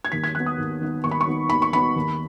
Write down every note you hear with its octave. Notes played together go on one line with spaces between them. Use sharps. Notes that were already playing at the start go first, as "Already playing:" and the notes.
G#6
D#2 B6
G#6
D#3 B3 F#6
D#6
D#2
D#3 B3
D#2 C#6
B5
C#6
D#3 B3
D#2 B5
C#6
D#3 B3 B5
D#2